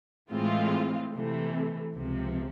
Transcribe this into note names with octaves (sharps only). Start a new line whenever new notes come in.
A2 E3 G#3 C4 F4
C3 E3 A3
C#2 C3 F3